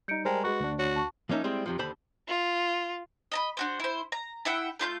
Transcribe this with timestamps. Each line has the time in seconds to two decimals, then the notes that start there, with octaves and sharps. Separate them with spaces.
0.08 G3 D#4 G6 C#7 D7
0.25 G3 G#3 A#4 C5 G5 A5 A#5
0.44 G#3 F#4 B4 C#6
0.60 D2 D4
0.79 F#4 C#5
0.96 A5 C#6
1.29 F3 A#3 C#4 D#4 E5
1.44 G3 G#3 C4 E4 C5
1.66 F2 C3 F3
1.79 D#2 D3 C5 A5 B5
2.27 F4
3.32 D#5 A#5 B5
3.57 D4 F#4 C5
3.80 E4 C5
4.12 A#5
4.45 E4 E5 F#5 G5
4.79 A3 F4 B5 G6